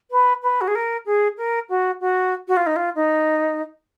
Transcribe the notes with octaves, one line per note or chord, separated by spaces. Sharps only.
B4
B4
F#4
G#4
A#4
G#4
A#4
F#4
F#4
F#4
F4
D#4
F4
D#4